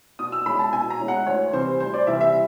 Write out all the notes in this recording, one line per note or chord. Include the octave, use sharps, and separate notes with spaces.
B2 D#6
E6
G#3 C#4 E4 B5
A5
B2 G#5
A#5
G#3 C#4 E4
F#5
D2 C#5
C3 E3 G3 C4 C5
D2 C5
D5
C3 E3 G3 C4 E5
E5